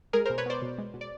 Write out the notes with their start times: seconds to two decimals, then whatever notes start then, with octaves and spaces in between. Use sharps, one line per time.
0.13 G#3 G#4 A#4
0.25 B2 A#4 C5
0.38 B4 C#5
0.46 B3 C5 D5
0.62 B2
0.78 G#3
0.94 B2
1.01 D5